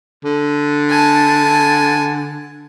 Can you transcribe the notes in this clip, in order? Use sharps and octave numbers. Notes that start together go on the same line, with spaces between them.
D3
G#5 A5